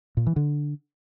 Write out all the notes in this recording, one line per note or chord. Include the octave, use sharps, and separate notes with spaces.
A#2
E3
D3